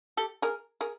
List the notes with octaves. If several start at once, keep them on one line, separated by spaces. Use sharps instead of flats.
G4 A4
G#4 A#4
G#4 A#4